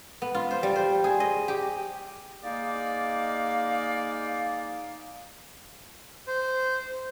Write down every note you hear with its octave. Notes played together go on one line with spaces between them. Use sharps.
B3
F4
C5
G3
C5
G#4
D#5
G4
G#3 A#3 D#4 D5 D#5 F5
C5